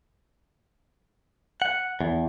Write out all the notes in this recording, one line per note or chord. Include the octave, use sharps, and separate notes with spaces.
F#5
E2